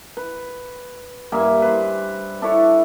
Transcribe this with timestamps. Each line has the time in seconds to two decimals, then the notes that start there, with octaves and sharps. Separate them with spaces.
0.17 B4
1.32 G2 A#3 E5 G#5
1.62 B4 C5
2.42 D4 E4 A4 C#5